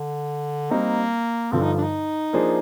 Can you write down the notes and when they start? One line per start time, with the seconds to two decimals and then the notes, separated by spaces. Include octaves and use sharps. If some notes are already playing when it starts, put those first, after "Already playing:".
Already playing: D3
0.71 G3 A#3 C4 D#4
1.52 G2 D3 F3 C4
1.62 D#4
1.78 D4
1.83 D#4
2.33 F3 A#3 D4 G#4 C5